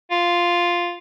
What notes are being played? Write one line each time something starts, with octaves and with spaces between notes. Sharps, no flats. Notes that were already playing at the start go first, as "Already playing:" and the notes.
F4